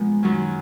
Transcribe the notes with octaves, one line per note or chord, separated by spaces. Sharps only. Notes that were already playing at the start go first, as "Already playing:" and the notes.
Already playing: A#2 F3 G#3 B3
F#2 D#3 F#3